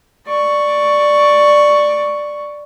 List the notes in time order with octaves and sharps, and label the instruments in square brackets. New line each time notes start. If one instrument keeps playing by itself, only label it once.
[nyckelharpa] D5 C#6